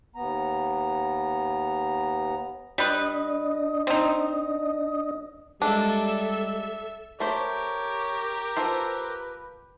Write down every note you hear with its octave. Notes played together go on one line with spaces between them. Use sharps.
D#2 B3 A#5
G3 D4 B4 D#5
C4 D#4
G3 G#3 A#3 D4 A4 E5
A3 G4 A#4 C5 C#5
F4 A4 B4 C5